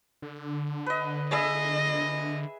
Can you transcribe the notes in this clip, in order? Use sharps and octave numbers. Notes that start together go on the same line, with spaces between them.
D3
B4 D#5
G#4 D#5 E5 B5